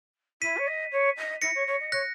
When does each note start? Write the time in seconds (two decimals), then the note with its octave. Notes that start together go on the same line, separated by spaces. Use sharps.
0.42 E4 B6 D#7
0.57 C#5
0.67 D#5
0.92 C#5
1.17 D#5
1.42 E4 A#6 C#7
1.55 C#5
1.67 C#5
1.80 D#5
1.92 C#5 F#6 A#6